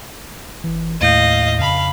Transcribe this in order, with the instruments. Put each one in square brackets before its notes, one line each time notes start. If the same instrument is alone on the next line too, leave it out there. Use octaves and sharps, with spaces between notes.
[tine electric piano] G1 E3
[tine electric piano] D#2 A2 G6 [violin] D#5 F5
[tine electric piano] F2 C#3 A5 [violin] F5 B5